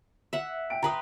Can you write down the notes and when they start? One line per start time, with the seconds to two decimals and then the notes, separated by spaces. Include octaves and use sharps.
0.33 E5 F#5
0.70 G5 D7
0.83 G4 B4 A#5 C6 D#6